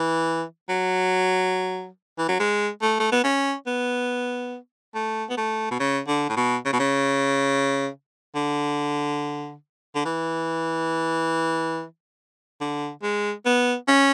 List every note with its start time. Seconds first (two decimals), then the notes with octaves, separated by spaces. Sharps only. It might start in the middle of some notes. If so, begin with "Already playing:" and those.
Already playing: E3
0.69 F#3
2.18 E3
2.28 F#3
2.40 G#3
2.82 A3
3.00 A3
3.12 B3
3.24 C#4
3.67 B3
4.95 A3
5.29 B3
5.37 A3
5.71 B2
5.80 C#3
6.08 D3
6.29 A2
6.36 B2
6.65 C#3
6.73 B2
6.79 C#3
8.35 D3
9.95 D3
10.05 E3
12.61 D3
13.03 G#3
13.45 B3
13.88 C#4